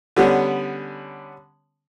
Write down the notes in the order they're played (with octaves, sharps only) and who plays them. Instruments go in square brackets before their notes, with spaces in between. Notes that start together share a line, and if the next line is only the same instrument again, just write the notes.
[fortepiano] D3 G3 B3 C#4